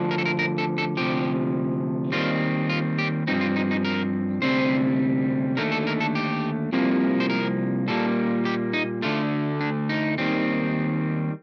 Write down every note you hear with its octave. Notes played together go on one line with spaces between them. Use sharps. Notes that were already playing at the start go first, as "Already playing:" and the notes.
Already playing: D2 D3 F3
A#4
A4
A#4
A#4
A4
A4
D2 C3 F3 G4
D#2 D#3 G3 C4 F4
F4
G4
G2 F3 C4 D#4
F4
D#4
D#4
A#4
D2 C3 G3 C4 C5
D#2 D3 A3 A#4
A4
A#4
A4
G4
C2 C3 F3 A#3
C5
A#4
A#2 G3 A#3 A4
G4
D#4
D2 D3 A3 F4
D4
D#4
D#2 D#3 G3 C4